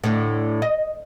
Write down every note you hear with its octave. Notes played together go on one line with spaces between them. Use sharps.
A2 D3
D#5